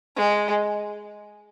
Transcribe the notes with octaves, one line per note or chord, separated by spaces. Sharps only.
G#3